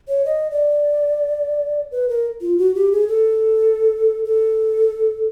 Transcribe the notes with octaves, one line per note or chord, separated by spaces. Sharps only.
C#5
D#5
D5
B4
A#4
F4
F#4
G4
G#4
A4
A4